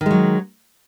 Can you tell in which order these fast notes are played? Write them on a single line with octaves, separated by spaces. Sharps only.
D#3 G#3 F#3